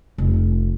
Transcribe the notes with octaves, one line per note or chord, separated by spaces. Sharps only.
F1